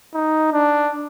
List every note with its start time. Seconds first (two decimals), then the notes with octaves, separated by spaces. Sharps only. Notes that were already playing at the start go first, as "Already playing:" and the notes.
0.14 D#4
0.52 D4